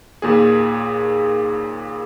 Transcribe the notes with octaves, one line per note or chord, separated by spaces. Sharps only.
D#2 A#2 G#4